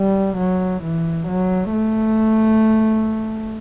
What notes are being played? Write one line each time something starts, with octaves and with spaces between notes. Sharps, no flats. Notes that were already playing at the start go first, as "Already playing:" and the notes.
Already playing: G3
F#3
E3
F#3
A3